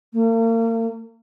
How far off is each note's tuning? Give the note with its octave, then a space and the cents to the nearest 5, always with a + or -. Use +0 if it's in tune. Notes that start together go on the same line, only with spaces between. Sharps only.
A#3 -40